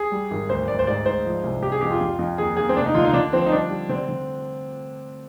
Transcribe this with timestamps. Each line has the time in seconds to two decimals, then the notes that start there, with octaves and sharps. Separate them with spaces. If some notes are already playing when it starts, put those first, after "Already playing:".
Already playing: G#4
0.12 G3
0.31 G#1
0.49 D2 C5
0.68 D2 D5
0.79 C5
0.87 G#2 D5
1.06 G#2 C5
1.25 F3
1.44 C2
1.62 C3 G4
1.72 G#4
1.81 F2 G4
1.90 F4
2.01 F2
2.19 F2
2.38 D#2 G#4
2.57 D#2 G#4
2.69 C4
2.77 F1 D4
2.86 D#4
2.94 D3 F4
3.04 D#4
3.13 D3 D4
3.33 F3 C4
3.46 D#4
3.52 G3 D4
3.70 G3
3.89 D3 C4
4.09 D3